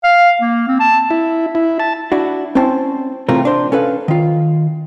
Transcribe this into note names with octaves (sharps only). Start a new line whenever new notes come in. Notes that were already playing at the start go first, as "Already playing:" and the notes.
F5
A#3
C4
A5
E4
E4
A5
D4 E4 F#4
C4 C#4 E4 C5 A5
C3 E3 A3 C4 F4 A#4
D4 C5
C#4 A4 B4 F5
D#3 F4